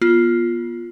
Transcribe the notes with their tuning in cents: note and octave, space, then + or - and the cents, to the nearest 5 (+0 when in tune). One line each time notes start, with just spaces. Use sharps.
B3 -40 F4 +0